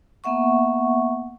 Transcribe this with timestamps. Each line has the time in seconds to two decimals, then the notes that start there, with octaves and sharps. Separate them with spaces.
0.24 A#3 B3 E5 F#5 C#6